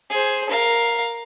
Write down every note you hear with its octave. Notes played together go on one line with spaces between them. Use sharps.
G#4 C5
A#4 F5